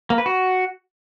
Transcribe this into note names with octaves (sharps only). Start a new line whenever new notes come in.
A#3
B4
F#4